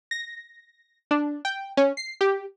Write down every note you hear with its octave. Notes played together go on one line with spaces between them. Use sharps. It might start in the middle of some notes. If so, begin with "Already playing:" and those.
A#6
D4
G5
C#4
C7
G4